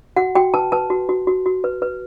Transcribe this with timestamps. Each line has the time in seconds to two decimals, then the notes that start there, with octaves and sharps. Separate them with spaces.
0.17 F#4 F#5
0.35 F#4 G5
0.54 B4 A5
0.72 B4 A5
0.90 F#4
1.09 F#4
1.27 F#4
1.46 F#4
1.64 B4
1.82 B4